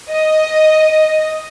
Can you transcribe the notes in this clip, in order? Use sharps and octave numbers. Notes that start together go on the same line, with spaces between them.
D#5